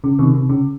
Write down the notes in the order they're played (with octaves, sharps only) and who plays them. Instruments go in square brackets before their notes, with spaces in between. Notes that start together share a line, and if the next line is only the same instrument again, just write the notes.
[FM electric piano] C#3
C3 D#3
C3
C#3